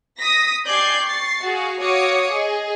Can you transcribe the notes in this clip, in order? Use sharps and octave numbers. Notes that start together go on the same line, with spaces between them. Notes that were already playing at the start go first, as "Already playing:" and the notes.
D#6 A#6 B6
G4 D5 G#5 G6 G#6 C7
C#6 A6 C7
F#4 G#4 F5
F#4 C#5 F5 D6 D#6 C#7
G#4 D#5